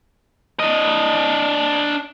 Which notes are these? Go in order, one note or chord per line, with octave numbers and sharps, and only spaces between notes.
D4 D#5